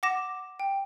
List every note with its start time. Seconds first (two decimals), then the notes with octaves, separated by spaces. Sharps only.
0.03 F#5 D6 A#6 E7
0.60 G5